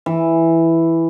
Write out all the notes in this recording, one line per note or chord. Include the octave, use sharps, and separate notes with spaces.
E3